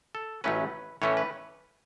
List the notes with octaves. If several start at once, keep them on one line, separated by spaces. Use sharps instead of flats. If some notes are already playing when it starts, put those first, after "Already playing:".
A4
A1 A2 F#3 A3 C#4 B4
A2 E3 A3 C#4 C#5
B4